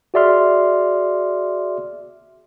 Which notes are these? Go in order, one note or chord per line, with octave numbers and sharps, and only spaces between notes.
F#4 G#4 D5 E5 C6 F6